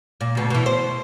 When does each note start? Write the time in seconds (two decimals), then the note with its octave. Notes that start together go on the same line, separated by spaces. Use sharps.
0.21 A#2
0.35 D2 B2
0.50 B2 E3
0.66 C5